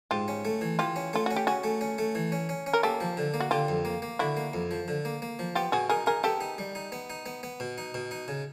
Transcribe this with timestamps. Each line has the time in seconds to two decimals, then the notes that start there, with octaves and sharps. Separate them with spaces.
0.11 G#2 F4 G4
0.28 C#4
0.45 A3
0.61 E3
0.79 E3 F4 G4
0.96 C#4
1.13 A3 F4
1.26 C#4 F#4
1.36 G4
1.47 C#4 F#4 G#4
1.64 A3
1.81 C#4
1.98 A3
2.15 E3
2.32 C#4
2.49 C#4
2.66 C#4
2.73 A#4
2.83 A#3 G4 A4
3.01 F3
3.17 D3
3.34 A#3
3.40 F#4
3.51 D3 F4 G4
3.68 F2
3.85 A#3
4.02 A#3
4.19 D3 E4 F#4
4.37 A#3
4.53 F2
4.71 F3
4.88 D3
5.05 A#3
5.22 A#3
5.39 F3
5.55 B3 F4 G4
5.72 B2 F#4 G#4
5.89 D#4 G#4 A#4
6.06 D#4 G#4 A#4
6.24 B3 G4 A4
6.41 D#4
6.58 G3
6.75 D#4
6.92 B3
7.10 D#4
7.26 B3
7.43 B3
7.60 B2
7.78 D#4
7.94 B2
8.11 D#4
8.28 C#3